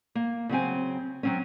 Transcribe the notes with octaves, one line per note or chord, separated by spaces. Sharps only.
A#3
C#3 F#3 C4 G#5
F#3 C4 C#4